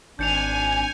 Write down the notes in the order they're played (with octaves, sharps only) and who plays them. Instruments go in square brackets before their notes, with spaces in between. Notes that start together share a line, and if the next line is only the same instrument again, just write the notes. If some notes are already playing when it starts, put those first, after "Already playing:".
[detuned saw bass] G#1 [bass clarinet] D4 [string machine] G#5 [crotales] G6 C#7 F7